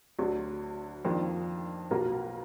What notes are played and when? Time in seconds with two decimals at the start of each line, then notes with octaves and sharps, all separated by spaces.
0.19 D2 D3 F#3 D4
1.05 F2 D#3 A#3 D4 F4
1.91 B1 B2 A#3 F4 A#4